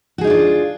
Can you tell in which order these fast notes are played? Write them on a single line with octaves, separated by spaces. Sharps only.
F#4 G#4 D#4 D4 F4